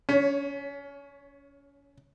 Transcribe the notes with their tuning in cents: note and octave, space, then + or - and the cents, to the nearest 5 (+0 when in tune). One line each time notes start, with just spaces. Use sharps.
C#4 +30 C#5 +0